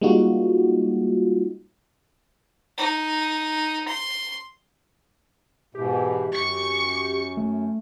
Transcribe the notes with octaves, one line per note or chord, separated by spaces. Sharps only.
G3 G#3 A#3 D#4 F4 F#4
D#4
C6
G#2 B2 E3 G4
F#2 C#6 C#7
A3